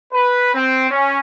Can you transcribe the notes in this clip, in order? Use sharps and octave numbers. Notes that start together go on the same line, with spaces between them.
B4
C4
C#4